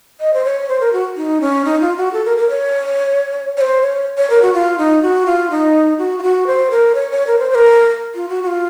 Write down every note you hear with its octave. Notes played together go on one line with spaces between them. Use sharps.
D#5
C5
C#5
C5
A#4
F#4
D#4
C#4
D#4
F4
F#4
A4
A#4
A#4
C#5
C#5
C5
C#5
C#5
A#4
F#4
F4
D#4
F#4
F4
D#4
F#4
F4
F#4
C5
A#4
C#5
C#5
A#4
C5
C5
A#4
F4
F#4
F#4
F4